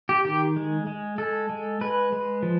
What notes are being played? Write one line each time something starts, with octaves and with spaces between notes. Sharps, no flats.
G4
D#3 G4
G#3
G#3
G#3 A4
G#3
G#3 B4
G#3
F3